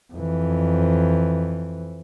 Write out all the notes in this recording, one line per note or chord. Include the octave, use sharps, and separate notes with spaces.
F2 E3